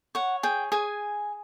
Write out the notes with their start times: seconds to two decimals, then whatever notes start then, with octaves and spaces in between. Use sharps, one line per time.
0.15 C#5 F#5
0.43 G#4 G5
0.72 G#4 G#5